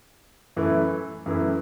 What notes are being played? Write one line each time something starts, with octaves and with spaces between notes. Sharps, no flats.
F#2 E3 A3 E4
F#2 E3 A3 E4